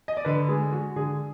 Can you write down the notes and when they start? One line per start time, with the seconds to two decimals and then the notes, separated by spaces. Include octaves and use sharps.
0.08 D#5
0.17 D5
0.25 D3 B4
0.48 G#3 G#4
0.72 G#3 F#4
0.96 D3 G#4